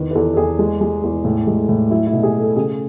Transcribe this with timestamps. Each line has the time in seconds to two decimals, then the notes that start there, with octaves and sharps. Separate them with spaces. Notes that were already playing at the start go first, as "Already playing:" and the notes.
Already playing: E2 D#3 B4
0.11 B4
0.15 E2 A4
0.33 A4
0.37 E2 G#4
0.59 G#3
0.81 G#3
1.03 E2
1.25 A2
1.47 G#3
1.69 A2
1.90 F#3 E4
2.07 E4
2.13 B2
2.23 G#4
2.35 A3
2.40 A4
2.56 C#3 G#4